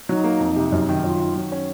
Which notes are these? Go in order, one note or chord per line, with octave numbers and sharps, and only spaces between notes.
F#3 D#4
A#3
F2
C3
F#2
D#3
F#2 F4
D#3
F#3
C#4